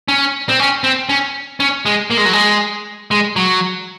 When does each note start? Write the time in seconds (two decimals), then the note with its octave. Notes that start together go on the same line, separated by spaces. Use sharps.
0.08 C#4
0.49 C4
0.60 C#4
0.84 C4
1.09 C#4
1.60 C#4
1.86 G#3
2.10 A#3
2.17 G#3
2.25 F#3
2.33 G#3
3.11 G#3
3.36 F#3